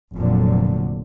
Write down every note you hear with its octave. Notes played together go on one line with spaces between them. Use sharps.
F1 F2 A#2 D3 F#3